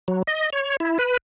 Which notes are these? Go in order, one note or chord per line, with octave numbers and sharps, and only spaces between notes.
F#3
D#5
C#5
E4
B4